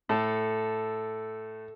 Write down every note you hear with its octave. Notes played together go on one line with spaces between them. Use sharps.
A2 A4